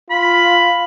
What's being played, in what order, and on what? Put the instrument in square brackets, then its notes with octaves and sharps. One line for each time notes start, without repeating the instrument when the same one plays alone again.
[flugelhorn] F4 [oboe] B5